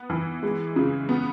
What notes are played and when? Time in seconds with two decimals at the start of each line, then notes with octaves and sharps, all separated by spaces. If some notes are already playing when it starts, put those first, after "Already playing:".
Already playing: B3
0.10 E3
0.43 G#3
0.76 C#3
1.09 B3